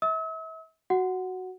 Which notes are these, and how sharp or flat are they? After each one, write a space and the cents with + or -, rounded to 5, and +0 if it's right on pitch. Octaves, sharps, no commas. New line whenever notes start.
E5 -35 E6 -45
F#4 +0 F#5 +0